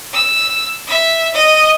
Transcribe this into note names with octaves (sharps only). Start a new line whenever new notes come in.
E6
E5
D#5 D#6